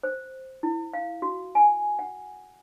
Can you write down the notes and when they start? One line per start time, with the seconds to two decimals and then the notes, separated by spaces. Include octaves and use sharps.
0.03 C5
0.63 E4
0.94 F5
1.22 F#4
1.55 G#5
1.99 F#5